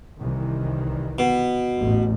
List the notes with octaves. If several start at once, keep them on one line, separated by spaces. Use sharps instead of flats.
C2 D#3 E3
B2
A1 E2